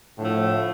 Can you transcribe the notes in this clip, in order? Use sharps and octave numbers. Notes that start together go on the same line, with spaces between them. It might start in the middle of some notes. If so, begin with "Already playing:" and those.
A2 D3 F3 A3